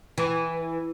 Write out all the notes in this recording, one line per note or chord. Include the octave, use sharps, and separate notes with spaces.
E3